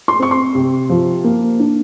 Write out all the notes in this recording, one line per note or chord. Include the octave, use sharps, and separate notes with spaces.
C6
C4 C#6
C6
C3
F3
A#3
D4